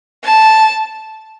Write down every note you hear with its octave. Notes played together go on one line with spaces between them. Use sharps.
A5